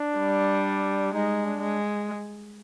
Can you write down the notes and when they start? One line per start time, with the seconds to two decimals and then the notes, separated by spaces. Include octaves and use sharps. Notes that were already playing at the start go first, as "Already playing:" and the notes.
Already playing: D4
0.19 G3
1.14 G#3 D#4
1.45 D4
1.62 G#3